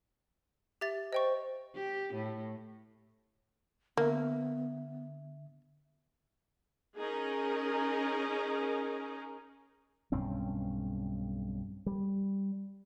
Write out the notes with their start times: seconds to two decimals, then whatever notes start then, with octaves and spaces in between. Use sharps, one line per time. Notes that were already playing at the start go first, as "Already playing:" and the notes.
0.81 G4 E5 A6
1.13 C5 D#5 G5 C#6
1.75 G4
2.13 A2
3.97 D3 A#3 B3 E5
6.96 C#4 D#4 G#4 A#4
10.12 B1 G2 C4 C#4
11.86 G3